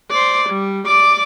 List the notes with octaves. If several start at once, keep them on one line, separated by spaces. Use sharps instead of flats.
C5 D5
G3
D5 D6